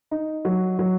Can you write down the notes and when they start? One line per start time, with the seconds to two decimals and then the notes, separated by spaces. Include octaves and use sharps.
0.11 D#4
0.45 F#3
0.79 F#3